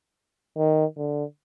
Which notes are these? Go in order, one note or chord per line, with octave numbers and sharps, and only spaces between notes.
D#3
D3